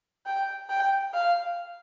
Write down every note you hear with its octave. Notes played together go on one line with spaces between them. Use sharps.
G5
G5
F5